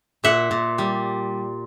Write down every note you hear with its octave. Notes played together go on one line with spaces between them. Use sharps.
A#2 E5 F#5
A#2
G3